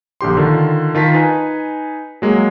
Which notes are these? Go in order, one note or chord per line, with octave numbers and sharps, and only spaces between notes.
A#1 D3 G4 C6
D3 D#3 F4
D#3 F4 A5 B6
D#4 B4 G#5
F#3 G#3 A#3